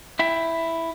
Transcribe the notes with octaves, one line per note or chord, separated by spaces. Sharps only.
E4 E5 G5